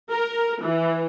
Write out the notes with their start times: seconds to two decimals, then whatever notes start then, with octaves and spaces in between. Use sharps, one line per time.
0.11 A#4
0.62 E3